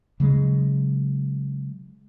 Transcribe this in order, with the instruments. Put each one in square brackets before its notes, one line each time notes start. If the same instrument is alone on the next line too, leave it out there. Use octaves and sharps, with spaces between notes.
[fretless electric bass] C#3 F#3 G#3